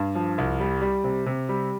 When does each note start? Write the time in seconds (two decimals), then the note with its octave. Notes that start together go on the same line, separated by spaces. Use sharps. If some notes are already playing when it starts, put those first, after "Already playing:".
Already playing: G2
0.15 F3
0.38 C2
0.60 G3
0.81 G3
1.04 C3
1.26 C3
1.49 G3